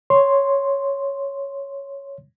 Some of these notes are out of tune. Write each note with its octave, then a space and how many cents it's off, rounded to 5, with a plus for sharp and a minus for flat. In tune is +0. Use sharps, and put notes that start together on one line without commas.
C#5 +0 C6 +0